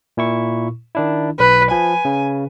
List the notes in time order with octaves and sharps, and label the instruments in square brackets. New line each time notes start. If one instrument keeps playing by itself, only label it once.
[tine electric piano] A#2 E4 C#6
D#3 D4 E4
[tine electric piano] B1 [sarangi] B4
[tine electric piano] F3 [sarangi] G#5
[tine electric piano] C#3